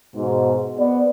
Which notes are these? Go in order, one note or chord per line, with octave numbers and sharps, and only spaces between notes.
G#2 B2
B3 C5 D5